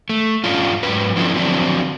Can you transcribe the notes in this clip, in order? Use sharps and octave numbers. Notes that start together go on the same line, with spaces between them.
A3
G2 C#4 D4 F4
G#2 F#3 B4
F3 C#4 D4 E4 F4 A4
D3 F3 F#3 C4 D4